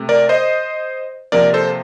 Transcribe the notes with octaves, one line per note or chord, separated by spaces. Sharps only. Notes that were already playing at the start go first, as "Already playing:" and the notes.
Already playing: C3 A3
A#4 D5
C5 D#5
C3 F3 A#3 A#4 D5
A4 C5